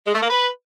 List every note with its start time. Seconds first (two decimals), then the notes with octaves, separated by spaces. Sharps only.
0.07 G#3
0.15 A3
0.22 A#3
0.30 B4